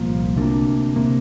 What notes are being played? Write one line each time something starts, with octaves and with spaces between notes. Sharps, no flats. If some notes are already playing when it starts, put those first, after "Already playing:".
Already playing: C2 A#2 F3 A#3
D2 C3 A#3 D4
C3 A#3